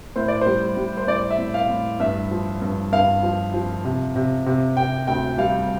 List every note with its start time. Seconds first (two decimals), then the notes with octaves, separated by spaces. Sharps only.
0.16 A2 C5
0.28 D5
0.41 G3 C5
0.77 G3
0.97 C5
1.07 A2 D5
1.30 E5
1.39 A2
1.54 F5
1.70 A2
2.00 G2 E5
2.31 F3
2.62 G2
2.92 G2 F5
3.23 F3
3.54 F3
3.85 C3
4.16 C3
4.46 C3
4.77 C3 G5
5.07 D2 G5
5.38 G3 F5